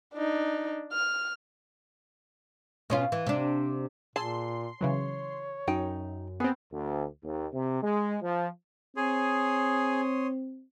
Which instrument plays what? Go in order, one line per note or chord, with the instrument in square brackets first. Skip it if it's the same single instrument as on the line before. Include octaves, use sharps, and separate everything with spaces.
[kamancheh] D4 D#4
F6
[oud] B2 C#4 F4
E3
C3 D4
[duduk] A#2 [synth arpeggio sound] G#4 E6 [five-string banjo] A5 [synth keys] C6
[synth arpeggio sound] C#3 E3 F#3 [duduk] C#5
[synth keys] F#2 [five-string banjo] D#4 G5
[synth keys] B3 C4 [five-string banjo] G#4
[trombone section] D2
D#2
C3
G#3
F3
[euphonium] C4 [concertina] G#4 [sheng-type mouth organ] C#5 C6 D#6